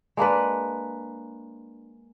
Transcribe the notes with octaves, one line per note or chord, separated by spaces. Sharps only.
G#3 A#3 D4 B4